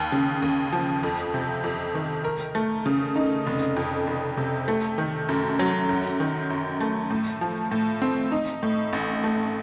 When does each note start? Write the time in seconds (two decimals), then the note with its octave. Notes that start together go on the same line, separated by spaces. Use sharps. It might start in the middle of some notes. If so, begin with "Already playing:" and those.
Already playing: D#2
0.12 C#3
0.42 D#2
0.73 F3
1.03 F2
1.34 C3
1.64 F2
1.95 D#3
2.24 A#4
2.55 A3
2.86 C#3
3.16 D#4
3.47 F1
3.76 F2
4.07 F1
4.37 C3
4.68 A3
4.98 D#3
5.29 F#2
5.59 F#3
5.89 F#2
6.20 D#3
6.50 F#2
6.80 A3
7.10 A2
7.41 F3
7.71 A2
8.02 C4
8.32 D#4
8.63 A2
8.93 A1
9.24 A3